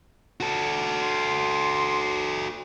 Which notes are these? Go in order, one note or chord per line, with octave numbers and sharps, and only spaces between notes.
F#4 A4
C6